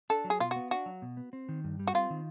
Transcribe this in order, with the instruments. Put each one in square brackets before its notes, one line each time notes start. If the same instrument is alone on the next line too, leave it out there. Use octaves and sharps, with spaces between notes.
[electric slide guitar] D4 [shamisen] A4
[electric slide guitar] F#3
[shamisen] G#4
[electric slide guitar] B2 [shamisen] F4
[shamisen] F#4
[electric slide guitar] B3
[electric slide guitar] D4 [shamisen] F#4
[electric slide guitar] F#3
B2
B3
C4
D#3
G2
G3
[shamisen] F#4
[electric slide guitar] C4 [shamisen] F4
[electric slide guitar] D#3